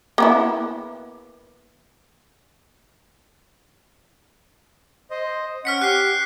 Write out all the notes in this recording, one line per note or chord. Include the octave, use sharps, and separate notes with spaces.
A#3 B3 E4
C5 D#5
C#4 F#5 F6 B6 C#7
G4 F#6 C7